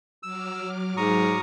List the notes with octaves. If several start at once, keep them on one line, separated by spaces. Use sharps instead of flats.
F#3 D6 E6 F6
G#2 A#5 C#6 D#6